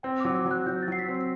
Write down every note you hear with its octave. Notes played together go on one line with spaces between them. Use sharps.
C4 G5
D6
F#3
D6
F#3
F#6
F#3 G6
A6
F#3 C7
B6
C4
C7